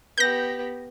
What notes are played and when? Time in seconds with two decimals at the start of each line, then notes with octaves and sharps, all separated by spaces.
0.18 B3 G4 G6 A#6